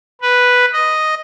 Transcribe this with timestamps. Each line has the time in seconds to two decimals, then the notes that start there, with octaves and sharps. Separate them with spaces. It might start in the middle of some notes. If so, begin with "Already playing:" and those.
0.22 B4
0.73 D#5